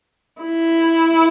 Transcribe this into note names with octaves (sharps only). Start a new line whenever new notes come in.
E4